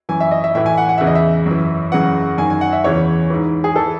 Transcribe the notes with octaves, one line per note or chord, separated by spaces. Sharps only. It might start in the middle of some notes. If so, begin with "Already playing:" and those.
F#2 E3 G#5
E5
D#5
E5
A2 E3 E5
G#5
F#5
F#5
E2 C#3 E3 E5
D#5
E5
F#2 E3
F#2 C#3 E3 F#5
F#2 D#3 G#5
G#5
F#5
E5
E2 C#3 E3 C#5
G#2 E3
G#4
E3 A4